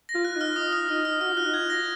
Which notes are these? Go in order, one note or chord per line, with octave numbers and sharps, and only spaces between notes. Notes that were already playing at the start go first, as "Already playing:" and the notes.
A#6
F4
F#6
D#4 F6
F4 D#6
F6
D#4 F6
F6
F#4 F6
F4 F#6
D#4
G#6
F4
A#6